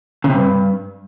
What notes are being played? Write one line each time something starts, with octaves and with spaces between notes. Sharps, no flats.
C#3
C3
G2